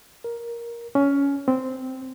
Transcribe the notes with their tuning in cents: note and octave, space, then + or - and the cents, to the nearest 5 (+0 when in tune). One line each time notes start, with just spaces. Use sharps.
A#4 +10
C#4 +15
C4 -10